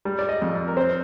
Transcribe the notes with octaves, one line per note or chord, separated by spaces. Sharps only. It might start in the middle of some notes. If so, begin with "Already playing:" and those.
G3
D5
D#5
F2
A#4
C4 C5